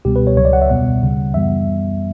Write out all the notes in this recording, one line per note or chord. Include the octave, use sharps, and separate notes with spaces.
C#2 B2 G3 B3 G4
B4
C#5
C#2 C#3 F#3 C#5
D5
F#5
E5
E2 B2 G3 B3 F#5
D2 C#3 G3
F#2 E3 G3 B3 E5